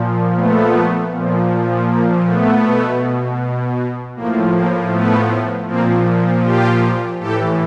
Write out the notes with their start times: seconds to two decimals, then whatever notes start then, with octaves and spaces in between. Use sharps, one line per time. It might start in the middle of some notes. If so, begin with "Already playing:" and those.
Already playing: A#2 F3
0.36 A3 B3
1.12 A#2 F3
1.88 A#3
2.25 A3 B3
2.64 B2
4.16 A2 F3 A#3
4.55 A#3
4.93 A3 B3
5.68 A#2 F3 A#3 C4
6.44 F4 G4
7.20 A2 E3 G4 A4